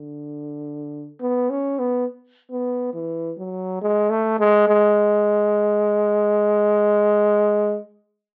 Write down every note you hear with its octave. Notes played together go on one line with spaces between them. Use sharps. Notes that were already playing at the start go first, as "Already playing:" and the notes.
Already playing: D3
B3
C#4
B3
B3
E3
F#3
G#3
A3
G#3
G#3